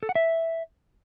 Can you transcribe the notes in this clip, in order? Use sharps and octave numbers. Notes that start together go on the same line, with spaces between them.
A4
F#5
E5